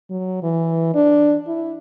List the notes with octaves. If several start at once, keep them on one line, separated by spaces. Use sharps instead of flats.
F#3
E3
D4
E4